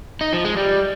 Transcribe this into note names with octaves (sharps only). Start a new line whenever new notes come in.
D#4
F3
G#3
G3